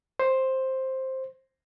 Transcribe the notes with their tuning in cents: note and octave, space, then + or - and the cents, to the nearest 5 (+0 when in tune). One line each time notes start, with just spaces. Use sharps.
C5 +10